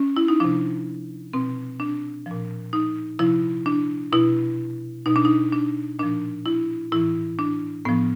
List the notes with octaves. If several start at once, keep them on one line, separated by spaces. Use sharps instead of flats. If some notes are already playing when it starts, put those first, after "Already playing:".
Already playing: C#4
E4
D#4
C3 F3 D4
B2 C4
D4
A#2 F3
D#4
C3 F3 E4
D4
B2 E4
B2 D#4
D4
D#4
D4
A#2 F3 D4
E4
A2 E3 E4
D4
A2 F3 B3